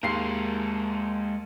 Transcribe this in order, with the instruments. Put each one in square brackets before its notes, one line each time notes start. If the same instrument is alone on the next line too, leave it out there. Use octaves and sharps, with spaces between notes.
[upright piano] D#2 C6 C7 [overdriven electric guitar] G#3 A#4